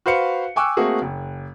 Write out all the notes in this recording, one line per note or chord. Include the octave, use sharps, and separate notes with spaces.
F#4 B4 C5 F5 C#7
G5 G#5 C#6 D6 E6 F#6
A3 A#3 C4 F#4 G#4
F#1